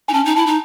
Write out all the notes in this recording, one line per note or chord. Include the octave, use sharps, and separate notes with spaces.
D#4 G#5
C#4 A5
D#4 G#5
E4 A5
D#4